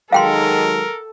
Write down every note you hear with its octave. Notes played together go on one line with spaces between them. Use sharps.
D#3 F#3 G#3 A4 A#4 F5 G5 C6